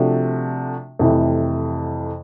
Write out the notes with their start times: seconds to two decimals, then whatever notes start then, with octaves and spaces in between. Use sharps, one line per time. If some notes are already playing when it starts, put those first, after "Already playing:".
Already playing: C3 F3 A3 D4 F#4
0.99 F2 C3 E3 A3